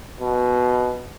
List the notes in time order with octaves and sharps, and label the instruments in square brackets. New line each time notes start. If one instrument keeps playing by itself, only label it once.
[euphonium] B2